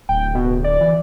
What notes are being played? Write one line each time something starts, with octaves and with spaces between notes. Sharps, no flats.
D1 G5
B2
D5
E3